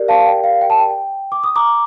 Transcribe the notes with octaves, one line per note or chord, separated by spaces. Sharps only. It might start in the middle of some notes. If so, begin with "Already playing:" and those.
Already playing: G4 A#4 D5
F5 A5
G5
F5
G5
A5
G5
D6
D#6
A#5 D6